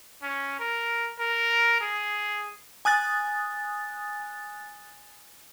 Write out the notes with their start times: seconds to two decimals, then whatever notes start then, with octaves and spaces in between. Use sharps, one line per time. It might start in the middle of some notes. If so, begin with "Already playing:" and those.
0.23 C#4
0.59 A#4
1.19 A#4
1.81 G#4
2.85 G#5 D#6 F#6 A6